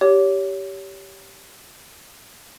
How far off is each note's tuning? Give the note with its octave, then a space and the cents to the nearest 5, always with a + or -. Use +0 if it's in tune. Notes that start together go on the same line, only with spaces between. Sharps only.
G4 -5 C#5 +25